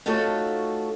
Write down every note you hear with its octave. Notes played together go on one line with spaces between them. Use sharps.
A3 D#4 F4 F#4 A4 C#5